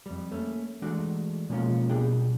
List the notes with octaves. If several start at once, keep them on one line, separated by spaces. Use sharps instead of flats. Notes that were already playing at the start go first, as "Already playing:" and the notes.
F2 G3
A3 A#3 C#4
E3 G#3 A3 D4 F#4
B2 F3 G#3 A#3 C#4 F4
B2 G3 D4 G#4 G5